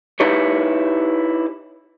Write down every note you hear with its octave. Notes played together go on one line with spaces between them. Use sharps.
D#4 E4 G4 B4 C#5